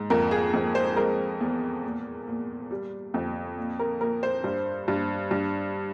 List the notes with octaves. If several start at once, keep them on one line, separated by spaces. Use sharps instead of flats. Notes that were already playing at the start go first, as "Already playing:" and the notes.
Already playing: G#2
F2 A#4
G#4
F2
C5
G#3 A#4
E2
A#2
A#2
G3
F2
A#2
A#4
A#2 A#4
C5
G2
G2
G2